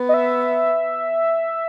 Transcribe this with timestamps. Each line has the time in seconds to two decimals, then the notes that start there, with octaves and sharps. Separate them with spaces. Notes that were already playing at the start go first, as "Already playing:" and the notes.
Already playing: B3
0.09 D#5
0.14 E5